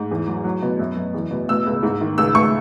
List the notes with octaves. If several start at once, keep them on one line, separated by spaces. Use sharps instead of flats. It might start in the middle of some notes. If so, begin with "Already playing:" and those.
Already playing: G#2
E2
F#3
F#3
B2
F#2
F#2
E2
B2
B2 E6
C#2
G#2
D#3
C#2 E6
C#2 C#6